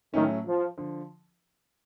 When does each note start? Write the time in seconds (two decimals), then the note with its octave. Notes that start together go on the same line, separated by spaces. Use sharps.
0.14 A2 D#3 F#3 A3 C#4
0.46 F3
0.77 D3 F3